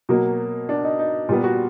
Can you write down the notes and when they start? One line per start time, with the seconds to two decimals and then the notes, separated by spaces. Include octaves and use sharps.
0.09 B2 F#3 A#3
0.69 D4
0.84 D#4
0.99 D#4
1.29 A#2 G3 B3 F4
1.44 F#4